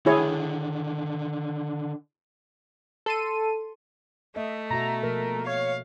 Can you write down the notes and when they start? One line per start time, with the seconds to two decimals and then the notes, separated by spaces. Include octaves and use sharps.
0.06 D3 D#3 E4 G#4 C#5
3.06 A4 C6 D#7
4.36 A3 D#5 E5
4.70 B2 F#4 E5 A#5
5.03 B2 F3 A#3 A#4
5.47 C#5 F5